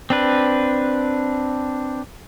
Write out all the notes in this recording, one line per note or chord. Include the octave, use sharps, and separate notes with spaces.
C4 D4 B4